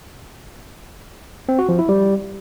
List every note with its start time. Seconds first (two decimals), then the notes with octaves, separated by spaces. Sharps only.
1.49 C4
1.59 F#4
1.69 F3
1.79 E4
1.89 G3